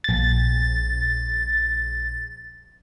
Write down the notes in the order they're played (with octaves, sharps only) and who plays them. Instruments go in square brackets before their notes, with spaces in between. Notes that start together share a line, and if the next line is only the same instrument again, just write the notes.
[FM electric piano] A#1 A6